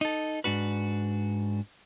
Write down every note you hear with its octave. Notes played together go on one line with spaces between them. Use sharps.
D#4 A4
G#2 D4 F#4 B4